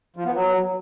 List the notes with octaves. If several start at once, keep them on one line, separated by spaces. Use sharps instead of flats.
F3
B3
F#3